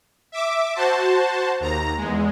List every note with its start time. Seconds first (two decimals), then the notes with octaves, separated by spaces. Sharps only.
0.32 E5 D6
0.75 F#4 C5 A5
1.60 D#2 A#5
1.97 E2 G#3